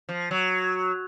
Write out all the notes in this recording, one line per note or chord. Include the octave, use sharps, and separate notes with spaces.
F3
F#3